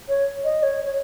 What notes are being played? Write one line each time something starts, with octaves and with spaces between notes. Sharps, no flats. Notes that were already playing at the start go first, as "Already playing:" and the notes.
C#5
D#5
C#5
C#5